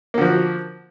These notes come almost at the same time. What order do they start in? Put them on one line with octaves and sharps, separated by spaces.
A#3 D3 F3 F#4